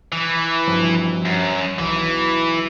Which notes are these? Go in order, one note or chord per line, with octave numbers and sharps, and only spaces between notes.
E3
G2 F3
F#2
B1 E3